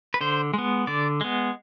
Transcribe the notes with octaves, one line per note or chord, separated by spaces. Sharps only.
B4
D3 C5
G#3 B3
D3 D5
G#3 B3